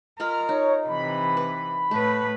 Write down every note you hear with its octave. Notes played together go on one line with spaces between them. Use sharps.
F4 A#4 D#5 B5 F6
D#4 C#5
C3 E3 B5
B4
A2 A3 B4